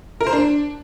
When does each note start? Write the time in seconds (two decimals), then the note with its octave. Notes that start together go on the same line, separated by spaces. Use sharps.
0.21 A#4
0.27 C5
0.33 D4